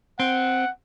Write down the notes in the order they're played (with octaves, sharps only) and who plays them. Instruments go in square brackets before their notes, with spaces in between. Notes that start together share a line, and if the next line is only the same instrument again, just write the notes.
[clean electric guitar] C4 [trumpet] F#5